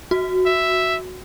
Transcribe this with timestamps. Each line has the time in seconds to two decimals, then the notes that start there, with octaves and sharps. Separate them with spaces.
0.11 F#4
0.46 E5